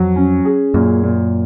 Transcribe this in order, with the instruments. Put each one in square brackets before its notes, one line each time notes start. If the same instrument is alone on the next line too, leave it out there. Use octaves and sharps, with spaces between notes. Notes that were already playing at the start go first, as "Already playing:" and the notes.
Already playing: [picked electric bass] F2 [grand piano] F#3
[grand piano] C#4
G#4
[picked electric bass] F#2 [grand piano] A#2
[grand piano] A#2